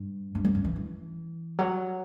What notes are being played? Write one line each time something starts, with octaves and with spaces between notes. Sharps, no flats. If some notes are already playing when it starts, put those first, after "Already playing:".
Already playing: G2
G2
F#2
F#2
E3
E3
F#3